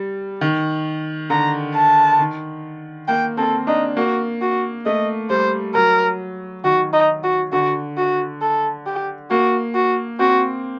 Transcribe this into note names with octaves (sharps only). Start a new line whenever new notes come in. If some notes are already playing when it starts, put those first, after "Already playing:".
Already playing: G3
D#3
D3 A#5
A5
D#3
A#3 G5
C4 A4
D4 D#4
A#3 F#4
F#4
A3 D#5
G3 C5
F#3 A#4
D#3 F#4
D#4
F#4
D3 F#4
F#4
A4
G4
A#3 F#4
F#4
C4 F#4